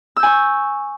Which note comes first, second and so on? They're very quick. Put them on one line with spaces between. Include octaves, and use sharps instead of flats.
E6 G6 G#5 C#6